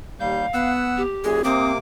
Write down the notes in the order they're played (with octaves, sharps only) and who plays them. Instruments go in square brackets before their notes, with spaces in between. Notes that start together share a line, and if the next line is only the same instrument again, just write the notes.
[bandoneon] D#2 G3 G6 [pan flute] F5
[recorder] B3 [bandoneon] F#5 E6
[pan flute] G4
[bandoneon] F#2 A#2 [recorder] G#4
[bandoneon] C3 A#3 D6 [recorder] C4 [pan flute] D#6